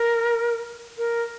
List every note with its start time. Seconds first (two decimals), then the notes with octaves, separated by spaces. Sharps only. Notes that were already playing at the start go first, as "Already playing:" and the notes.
Already playing: A#4
0.98 A#4